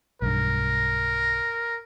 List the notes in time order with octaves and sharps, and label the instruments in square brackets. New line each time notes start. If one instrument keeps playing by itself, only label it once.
[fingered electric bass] B1 G2 [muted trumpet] A#4